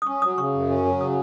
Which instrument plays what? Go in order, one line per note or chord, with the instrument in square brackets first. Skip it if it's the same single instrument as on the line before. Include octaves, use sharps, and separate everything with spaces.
[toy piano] D#6
[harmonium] C#4 [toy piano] C#6
[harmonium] F#3 [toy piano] D#6
[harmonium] C#3 [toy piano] C#6
[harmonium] F#2
C#4
F#3
[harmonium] C#3 [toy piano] D#6